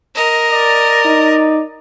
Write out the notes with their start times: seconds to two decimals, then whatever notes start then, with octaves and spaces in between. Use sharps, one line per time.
0.15 A#4 D#5
0.52 D5
1.05 D#4